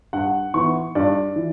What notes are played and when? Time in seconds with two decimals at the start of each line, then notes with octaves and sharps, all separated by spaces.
0.13 G2 F#5
0.54 E3 B3 C#6
0.95 G2 D5
1.36 E3